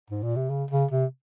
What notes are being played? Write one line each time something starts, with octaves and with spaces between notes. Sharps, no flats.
G#2
A#2
C3
C#3
C#3
C3